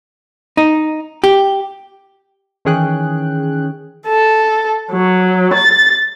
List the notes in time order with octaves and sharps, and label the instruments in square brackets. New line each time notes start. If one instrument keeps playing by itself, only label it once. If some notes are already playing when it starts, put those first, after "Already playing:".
[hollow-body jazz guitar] D#4
G4
[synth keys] D#3 E3 C#4 G#4 G5 F#6
[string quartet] A4
F#3
A6